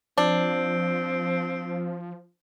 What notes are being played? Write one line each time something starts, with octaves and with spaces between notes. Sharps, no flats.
F3 C4 D4